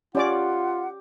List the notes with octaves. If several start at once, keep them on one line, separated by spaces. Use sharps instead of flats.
C#4 F4 G4 D5 F#5 D6